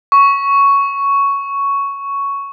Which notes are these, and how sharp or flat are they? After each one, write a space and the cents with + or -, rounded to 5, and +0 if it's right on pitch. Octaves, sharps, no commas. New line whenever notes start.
C#6 +5